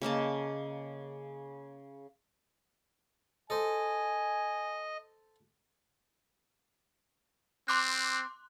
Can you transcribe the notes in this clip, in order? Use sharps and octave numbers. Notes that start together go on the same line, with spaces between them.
C#3 A#3 D#5 A5
A4 C5 D#5 G#5
C4 C6 D6 F#6